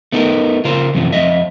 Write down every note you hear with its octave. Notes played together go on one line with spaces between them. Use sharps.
A3 B3 D#4 A4 A#4
C#3 F4 A#4 C5
F#2 C3 E3 F3
F2 C4 D#5 E5